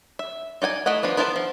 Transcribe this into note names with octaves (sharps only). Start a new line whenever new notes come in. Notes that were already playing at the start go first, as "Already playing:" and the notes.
E5
D#4 D5 G5 G#5
A3 E4 D#5 F#5
F3 B3 D4 D#4
B3 E4 A#4 C5 A5
F3